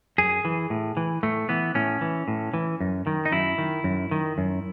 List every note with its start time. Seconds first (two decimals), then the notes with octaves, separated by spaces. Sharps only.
0.18 F#2 G#4
0.45 E3
0.70 A2
0.97 E3
1.23 A2 A3
1.49 E3 B3
1.75 A2 C#4
2.01 E3
2.28 A2
2.54 E3
2.81 F#2
3.07 D#3
3.25 D#4
3.32 F#2 E4
3.58 D#3
3.84 F#2
4.11 D#3
4.38 F#2